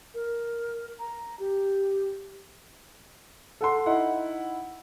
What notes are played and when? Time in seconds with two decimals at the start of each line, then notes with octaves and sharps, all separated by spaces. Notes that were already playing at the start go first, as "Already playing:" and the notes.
0.14 A#4
0.99 A#5
1.39 G4
3.61 A4 F#5 C6
3.86 D#4 E4 F#5